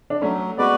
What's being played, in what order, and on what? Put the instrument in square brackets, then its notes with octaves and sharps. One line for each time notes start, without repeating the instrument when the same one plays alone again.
[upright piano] D4
[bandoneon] F#3 [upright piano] A3 C#4
[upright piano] G#3 B3 [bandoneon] F#4 B4 D5